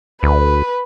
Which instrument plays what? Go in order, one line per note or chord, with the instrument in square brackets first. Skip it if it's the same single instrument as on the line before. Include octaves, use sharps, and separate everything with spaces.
[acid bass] D2 [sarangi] B4